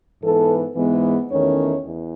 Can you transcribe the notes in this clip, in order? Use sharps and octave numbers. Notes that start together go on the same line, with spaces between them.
G#2 E3 B3 A4
G#2 E3 G#3 B3
E2 D#3 A3 C#4 C#5
E2